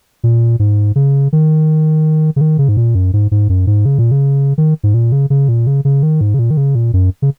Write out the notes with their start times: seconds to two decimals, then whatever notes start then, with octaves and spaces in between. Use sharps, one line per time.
0.24 A#2
0.59 G#2
0.96 C#3
1.33 D#3
2.36 C#3
2.41 D#3
2.58 C#3
2.69 G#2
2.77 A#2
2.95 F#2
3.13 G#2
3.31 G#2
3.49 F#2
3.67 G#2
3.86 C#3
3.99 A#2
4.11 C#3
4.58 D#3
4.83 G#2
4.94 A#2
5.12 C#3
5.30 C#3
5.49 A#2
5.67 C#3
5.85 C#3
6.03 D#3
6.21 G#2
6.34 C#3
6.39 A#2
6.51 D#3
6.57 C#3
6.75 A#2
6.93 F#2
7.22 C#3